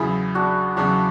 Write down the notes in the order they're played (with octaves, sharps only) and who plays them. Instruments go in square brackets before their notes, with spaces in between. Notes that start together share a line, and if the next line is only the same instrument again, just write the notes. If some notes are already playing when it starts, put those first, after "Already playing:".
Already playing: [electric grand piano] E2 C#3 F#3 [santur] E4 G#4
[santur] D4 F#4
[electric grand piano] E2 C#3 F#3 [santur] D4 F#4